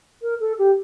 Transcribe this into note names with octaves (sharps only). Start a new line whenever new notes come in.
A#4
A4
G4